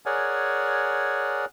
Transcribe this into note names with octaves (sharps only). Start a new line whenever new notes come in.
G#4 A#4 C#5 D5 F#5 G#5